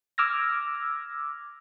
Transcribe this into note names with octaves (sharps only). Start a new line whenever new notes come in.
D6 E6 F6 G#6 A#6